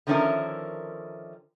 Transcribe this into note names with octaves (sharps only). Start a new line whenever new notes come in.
D3 D#3 F3 C#4 E4 A#4